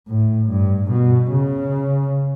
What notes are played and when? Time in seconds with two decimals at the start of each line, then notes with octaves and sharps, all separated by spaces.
0.08 A2
0.49 G2
0.91 B2
1.32 C#3